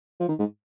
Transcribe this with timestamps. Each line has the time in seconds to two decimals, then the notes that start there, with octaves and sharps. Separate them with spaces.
0.20 F3
0.29 D#3
0.39 G#2